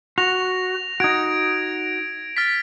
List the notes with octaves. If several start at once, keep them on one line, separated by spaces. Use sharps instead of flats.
F#4 A#6 F7
D#4 F#4 G#6 D7
F6 A6 B6